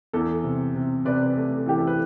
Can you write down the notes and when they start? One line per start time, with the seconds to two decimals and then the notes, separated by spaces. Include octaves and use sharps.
0.13 E2 A4
0.44 C3
0.75 C3
1.05 C3 B4 D5
1.37 A3
1.66 E3 G4
1.78 A4
1.87 B4